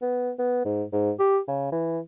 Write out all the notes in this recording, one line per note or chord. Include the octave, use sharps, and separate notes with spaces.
B3
B3
G#2
G#2
G4
C#3
E3